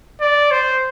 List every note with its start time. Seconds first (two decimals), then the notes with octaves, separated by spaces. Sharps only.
0.21 D5
0.51 C5